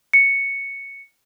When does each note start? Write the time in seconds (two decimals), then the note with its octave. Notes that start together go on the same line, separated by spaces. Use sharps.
0.13 C#7